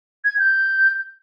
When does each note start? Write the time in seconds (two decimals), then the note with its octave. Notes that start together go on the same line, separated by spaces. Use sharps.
0.25 G#6
0.39 G6